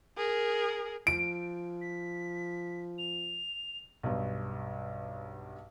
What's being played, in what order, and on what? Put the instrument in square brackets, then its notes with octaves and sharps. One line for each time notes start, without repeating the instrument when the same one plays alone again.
[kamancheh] G#4 A#4
[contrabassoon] F3 [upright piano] D7
[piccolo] B6
F7
[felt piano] B1 G2